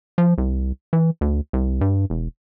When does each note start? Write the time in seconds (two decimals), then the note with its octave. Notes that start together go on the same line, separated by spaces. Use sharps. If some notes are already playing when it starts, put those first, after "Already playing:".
0.18 F3
0.38 C2
0.93 E3
1.21 D2
1.53 C2
1.81 G2
2.10 E1